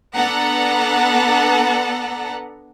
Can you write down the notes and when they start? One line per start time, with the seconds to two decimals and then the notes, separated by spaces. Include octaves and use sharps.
0.16 B3 D4 A4 F#5 A#5